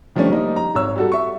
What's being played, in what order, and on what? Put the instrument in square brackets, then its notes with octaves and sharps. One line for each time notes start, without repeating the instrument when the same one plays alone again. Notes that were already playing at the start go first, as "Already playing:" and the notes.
[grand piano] D#3 F3 G3 A3 C#4 D4
F3 G3 A#3 D#4
A#5
G#1 C#5 E6
G3 F#4 A4
E5 C#6